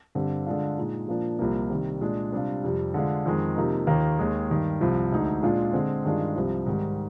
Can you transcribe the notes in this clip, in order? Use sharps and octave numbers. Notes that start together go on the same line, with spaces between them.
G2 D3 G3 C4
D3 G#3 D4 F4
A#2 G#3 D#4
A#2 F3 A#3 D4
C2 A#2 F3 A#3
C3 D#3 G3
A#2 G#3 D4
C3 G3 D4 F4
F2 C3 G3
D3 G#3 D4 F4
F2 D#3 G#3
C3 F3 A#3 D#4
D#2 D#3 A#3 F4
D#2 D#3 G#3
G2 D#3 G3
C2 C3 F3
D2 D3 G#3 D#4
A#2 G#3 D4 F4
D3 G#3 C4
G2 D#3 G#3 D4 F4
C2 C3 F3
G#2 D#3 G3